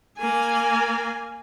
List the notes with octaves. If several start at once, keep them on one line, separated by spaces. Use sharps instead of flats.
A#3 G#5